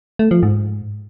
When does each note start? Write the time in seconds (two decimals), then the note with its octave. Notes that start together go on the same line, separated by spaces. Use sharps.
0.19 A3
0.31 F3
0.43 G#2